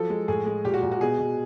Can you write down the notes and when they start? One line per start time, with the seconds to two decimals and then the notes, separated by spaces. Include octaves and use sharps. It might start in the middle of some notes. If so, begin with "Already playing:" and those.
Already playing: F3 F#3 A4
0.10 G#3
0.28 A2 G#4
0.46 G#3
0.65 A#2 G4
0.74 F#4
0.83 A#2
0.92 F#4
1.01 B2 G#4
1.19 B2